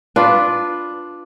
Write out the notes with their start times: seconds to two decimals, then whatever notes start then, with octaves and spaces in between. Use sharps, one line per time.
0.16 D4 F4 B4